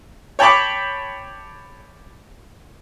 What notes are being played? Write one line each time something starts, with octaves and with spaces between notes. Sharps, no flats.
C#5 G5 A5 B5 C#6 D6